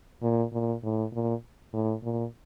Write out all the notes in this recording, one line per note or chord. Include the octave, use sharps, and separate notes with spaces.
A#2
A#2
A2
A#2
A2
A#2